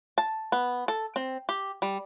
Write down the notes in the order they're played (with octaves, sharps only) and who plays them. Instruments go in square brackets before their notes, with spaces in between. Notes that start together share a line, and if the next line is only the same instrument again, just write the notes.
[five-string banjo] A5
B3
A4
C4
G4
G3